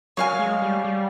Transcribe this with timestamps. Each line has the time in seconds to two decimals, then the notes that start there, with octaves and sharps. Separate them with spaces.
0.17 F#3 C#5 F5 G#5
0.39 G#3
0.62 G3
0.84 G3